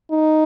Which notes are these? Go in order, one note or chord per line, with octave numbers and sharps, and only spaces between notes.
D#4